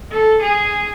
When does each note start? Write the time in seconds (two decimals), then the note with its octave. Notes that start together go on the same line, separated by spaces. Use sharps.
0.11 A4
0.42 G#4